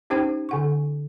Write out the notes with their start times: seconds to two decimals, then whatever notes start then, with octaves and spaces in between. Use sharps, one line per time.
0.10 C#4 D#4 G4 C5 G5
0.49 D3 F#5 C#6